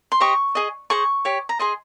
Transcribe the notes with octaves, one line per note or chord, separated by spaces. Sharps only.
C6
G4 C5 D#5 C#6
G#4 D#5
G#4 C5 D#5 C#6
G4 C#5
A#5
G#4 D#5 C6